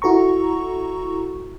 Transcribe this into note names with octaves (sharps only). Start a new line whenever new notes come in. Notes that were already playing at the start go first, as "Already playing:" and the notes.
E4 F#4 A4 A#5 C#6